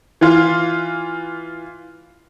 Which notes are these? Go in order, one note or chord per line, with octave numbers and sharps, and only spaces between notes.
E3 F4